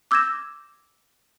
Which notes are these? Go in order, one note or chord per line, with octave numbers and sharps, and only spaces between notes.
D6 E6 G6 G#6 A#6 E7